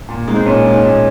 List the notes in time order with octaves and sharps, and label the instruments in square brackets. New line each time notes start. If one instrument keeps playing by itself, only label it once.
[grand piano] A#2
G#3 D#4
[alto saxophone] C4
[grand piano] A#2 [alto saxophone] C#4
[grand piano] G#3 D#4
A#2